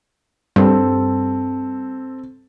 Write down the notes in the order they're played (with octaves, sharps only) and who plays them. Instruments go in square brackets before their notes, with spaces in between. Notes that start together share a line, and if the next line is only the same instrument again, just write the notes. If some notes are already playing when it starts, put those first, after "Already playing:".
[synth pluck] G2 [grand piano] C4 A4